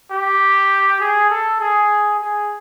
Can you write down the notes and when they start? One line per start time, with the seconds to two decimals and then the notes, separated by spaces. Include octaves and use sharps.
0.11 G4
1.00 G#4
1.30 A4
1.60 G#4
2.19 G#4